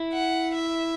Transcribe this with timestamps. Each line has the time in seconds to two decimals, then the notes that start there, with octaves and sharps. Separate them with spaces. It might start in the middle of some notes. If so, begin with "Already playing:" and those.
Already playing: E4
0.13 F#5
0.54 E5